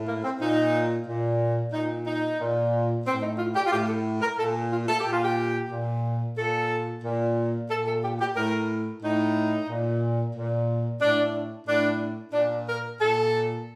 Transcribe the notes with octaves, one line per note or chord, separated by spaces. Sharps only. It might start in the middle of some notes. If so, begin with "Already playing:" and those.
Already playing: A2
A#3
C4
A#2 D#4
A#2
A#2 D#4
D#4
A#2
A2 C4
D#4
F4
G4
F4
A2 G4
A4
A#4
A#2 A4
F4
A4
A#2 G4
F4
G4
A#2
A#2 A4
A#2
A#2 A4
A4
G4
G4
A2 A#4
A2 D#4
A#2
A#2
A2 D4
A2 D4
A#2 D4
A#4
A#2 A4